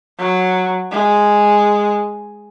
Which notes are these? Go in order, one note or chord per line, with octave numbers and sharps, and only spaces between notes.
F#3
G#3